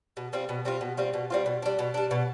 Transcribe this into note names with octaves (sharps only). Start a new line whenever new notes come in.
B2
G3 C4 F4
B2
G3 C4 F4
B2
G3 C4 F4
B2
G3 C4 F4
B2
G3 D4
B2
G3 D4
B2